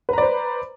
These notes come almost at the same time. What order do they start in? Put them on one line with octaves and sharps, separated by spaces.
B4 A#5 D5 C5